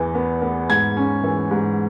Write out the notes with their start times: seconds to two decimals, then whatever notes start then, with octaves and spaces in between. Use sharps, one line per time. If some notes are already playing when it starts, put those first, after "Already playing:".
Already playing: E2 E3
0.15 B3
0.42 B3
0.69 G#2 G#6
0.97 C#4
1.24 E3
1.51 G#2